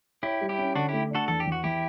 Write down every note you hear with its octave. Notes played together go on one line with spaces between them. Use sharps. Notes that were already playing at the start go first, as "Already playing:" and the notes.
E4 G4 C#5
G3
E4 G4
C#4
D3 D4 F#4
A3 E4 G4
D4 F#4 A4
E2 A4
G4
E2
F#4
E2 E4 G4